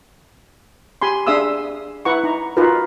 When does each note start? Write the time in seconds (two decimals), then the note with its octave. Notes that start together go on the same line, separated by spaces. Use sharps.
1.02 G4 G#5 B5 C6
1.27 D4 G#4 E5 F5 D#6 E6
2.05 E4 B4 F#5 A#5 C#6
2.24 D#4 A#5
2.57 D#4 F4 F#4 A#4 B4